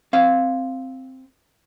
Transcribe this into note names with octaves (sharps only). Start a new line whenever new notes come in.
C4 F5